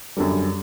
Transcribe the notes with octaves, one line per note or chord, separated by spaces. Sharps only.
F#2 D3 G3